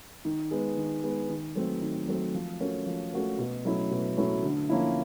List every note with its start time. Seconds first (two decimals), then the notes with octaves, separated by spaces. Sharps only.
0.25 D#3
0.51 G#3 B3
0.77 D#3
1.03 G#3 B3
1.29 D#3
1.56 F#3 A3 C4
1.82 D#3
2.08 F#3 A3 C4
2.34 F3
2.60 A3 C#4 F#4 A#4
2.86 F3
3.13 A3 C#4 F#4 A#4
3.39 B2
3.65 F#3 A3 C#4 E4
3.91 B2
4.17 F#3 A3 C#4 E4
4.43 D3
4.69 F3 A#3 C#4 E4